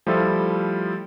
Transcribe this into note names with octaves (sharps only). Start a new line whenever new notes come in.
F3 G3 A3 E4 F4 A4